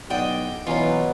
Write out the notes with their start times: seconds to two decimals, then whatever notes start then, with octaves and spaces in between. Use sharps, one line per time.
0.10 B1 E4 C5 D5 D#5 F#5 G5
0.67 B2 E3 F#3 C#4 F4 G#5 A#5